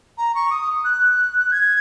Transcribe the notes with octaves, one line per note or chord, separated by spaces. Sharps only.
A#5
C#6
D#6
F#6
G#6